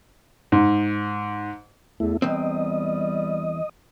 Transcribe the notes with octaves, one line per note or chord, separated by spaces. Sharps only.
G#2
E2 A3 E4
E2 G3 C4 D#5